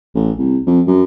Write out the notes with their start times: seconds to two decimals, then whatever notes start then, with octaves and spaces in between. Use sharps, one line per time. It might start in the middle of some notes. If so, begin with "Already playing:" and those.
0.15 A1
0.38 C2
0.67 F2
0.87 F#2